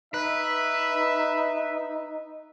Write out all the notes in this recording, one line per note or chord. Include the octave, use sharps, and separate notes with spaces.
D#4 B4 E5